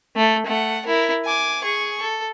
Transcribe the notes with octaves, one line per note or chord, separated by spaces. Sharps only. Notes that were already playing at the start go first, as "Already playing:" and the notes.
A3
A3 F#5
E4 A#4
G#5 D6
G#4 C#6
A4